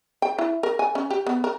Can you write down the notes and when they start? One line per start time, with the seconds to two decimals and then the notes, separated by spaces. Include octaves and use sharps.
0.22 G5
0.39 E4
0.63 A#4
0.79 G#5
0.95 C#4
1.10 G4
1.26 B3
1.44 A#4